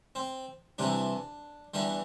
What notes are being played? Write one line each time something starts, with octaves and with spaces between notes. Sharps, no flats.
C4
C2 C3 E3 D4
E2 E3 G3 D4